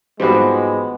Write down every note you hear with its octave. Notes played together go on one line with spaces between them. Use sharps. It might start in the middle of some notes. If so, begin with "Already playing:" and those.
G#2 F3 G3 G#3 B3 C4 F#4 G4